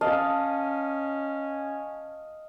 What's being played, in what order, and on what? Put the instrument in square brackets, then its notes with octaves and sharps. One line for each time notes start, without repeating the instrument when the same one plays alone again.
[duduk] C#4 [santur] D#5 F5 A5